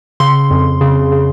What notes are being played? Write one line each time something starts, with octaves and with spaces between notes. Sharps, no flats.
C#3 C6
F2
C#3
C#3